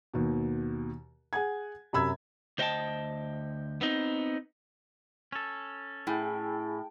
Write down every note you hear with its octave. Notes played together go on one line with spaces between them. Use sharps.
D#2 B2
G#4 F#5 G#5 G#6
F#2 C3 B5 E6 G#6
D2 C5 D#5 F5 G5 A5
B3 C4 D#4
C#4 A4
A2 E4 G#4 G5 G#5 B5